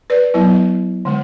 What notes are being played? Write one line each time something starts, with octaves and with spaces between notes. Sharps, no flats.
B4 D5
F#3 B3 E4
D3 G#3